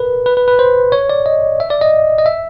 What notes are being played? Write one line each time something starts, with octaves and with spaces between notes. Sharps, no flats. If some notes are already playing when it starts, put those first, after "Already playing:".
Already playing: A#4 B4
B4
B4
B4
C5
C#5
D5
D#5
E5
D5
D#5
D#5
E5